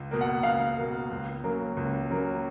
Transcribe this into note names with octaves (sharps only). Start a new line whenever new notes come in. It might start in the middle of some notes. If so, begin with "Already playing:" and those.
Already playing: C#2
B2 A#3
F#5
C#2 F5
B2 A#3
C#2
C#3 F#3 A#3
C#2
C#3 F#3 A#3